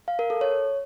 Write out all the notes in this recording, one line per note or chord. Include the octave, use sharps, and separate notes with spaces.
F5
A#4
A4
C#5